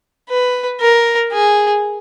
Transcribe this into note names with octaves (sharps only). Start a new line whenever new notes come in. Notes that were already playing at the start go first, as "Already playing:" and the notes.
B4
A#4
G#4